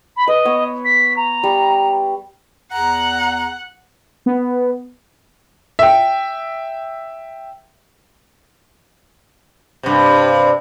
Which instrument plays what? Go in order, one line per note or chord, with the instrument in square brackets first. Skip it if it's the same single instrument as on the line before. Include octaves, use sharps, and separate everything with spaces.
[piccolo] B5
[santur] B4 [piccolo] D#5
[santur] B3 C#5
[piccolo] B6
A#5
[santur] G3
[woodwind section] E2 G#4 A#5 [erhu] F#5
[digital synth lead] B3
[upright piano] E5 G5
[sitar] G2 C3